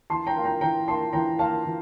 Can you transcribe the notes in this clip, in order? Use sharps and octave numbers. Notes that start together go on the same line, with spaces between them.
E3 A5 C6
G5 A#5
A#3 F4
G5 A#5
E3 G5 A#5
A#3 F4 A5 C6
E3 G5 A#5
A#3 F4 F5 A5
E3